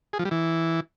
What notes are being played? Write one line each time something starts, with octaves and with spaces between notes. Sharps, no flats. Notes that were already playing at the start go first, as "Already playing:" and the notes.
G#4
F3
G3
E3